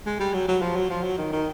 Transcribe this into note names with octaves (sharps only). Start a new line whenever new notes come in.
G#3
G3
F#3
F#3
F3
F#3
F3
F#3
D#3
D#3